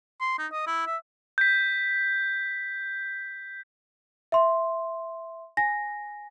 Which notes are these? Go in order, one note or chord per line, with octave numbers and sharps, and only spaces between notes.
C6
D#4
D#5
E4
E5
G6 B6
E5 C6
G#5 A#6